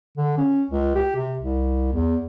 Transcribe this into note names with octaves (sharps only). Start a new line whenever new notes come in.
D3
C#4
C#2
G4
C3
C2
E2